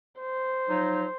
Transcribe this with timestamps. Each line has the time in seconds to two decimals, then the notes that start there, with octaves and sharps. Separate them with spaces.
0.21 C5
0.69 F3 F#3 D#4